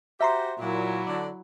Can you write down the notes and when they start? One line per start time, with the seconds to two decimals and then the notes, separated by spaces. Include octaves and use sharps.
0.21 F#4 G4 C5 E5 A#5 C6
0.59 A#2 F#3 E4
1.07 D3 D5